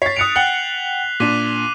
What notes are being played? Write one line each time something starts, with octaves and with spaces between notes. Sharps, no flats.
C#5 A6 B6 C7
D#6 F#6 C#7 D7 F7
F#5 G5 F#6 C#7 F#7 G7
A#2 D4 D6 B6 D#7